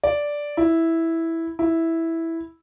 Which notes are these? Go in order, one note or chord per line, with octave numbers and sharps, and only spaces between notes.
D5
E4
E4